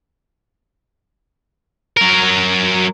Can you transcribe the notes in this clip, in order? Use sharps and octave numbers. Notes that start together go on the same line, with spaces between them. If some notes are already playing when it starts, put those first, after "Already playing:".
F#3 A#4